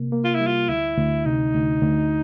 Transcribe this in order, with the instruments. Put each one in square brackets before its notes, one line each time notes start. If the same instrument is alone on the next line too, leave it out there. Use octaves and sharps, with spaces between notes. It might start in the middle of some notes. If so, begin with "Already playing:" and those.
Already playing: [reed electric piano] C3 A#3
A#3
[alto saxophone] F4
E4
[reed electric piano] G3
[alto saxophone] F4
[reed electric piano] D2 [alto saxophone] E4
[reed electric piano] D2
[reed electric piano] C3 [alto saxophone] D#4
[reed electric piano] D2
D2